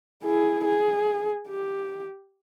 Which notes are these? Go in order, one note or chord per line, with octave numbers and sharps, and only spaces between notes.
E4 G#4
G#4
G4